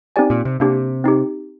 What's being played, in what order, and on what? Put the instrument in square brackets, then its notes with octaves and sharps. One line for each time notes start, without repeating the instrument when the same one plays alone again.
[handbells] C4 D#4 G4 D5 G#5
[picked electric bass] A#2
C3
[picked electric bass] C3 [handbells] A#3 D4 G4
[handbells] C4 D#4 G4